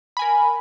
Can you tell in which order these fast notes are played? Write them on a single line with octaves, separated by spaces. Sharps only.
B5 G#5 A#4